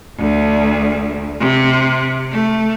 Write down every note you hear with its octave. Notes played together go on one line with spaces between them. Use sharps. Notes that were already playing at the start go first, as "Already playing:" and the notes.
D2
C3
A3